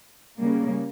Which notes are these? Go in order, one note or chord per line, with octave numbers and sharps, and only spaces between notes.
C#3 G3 A#3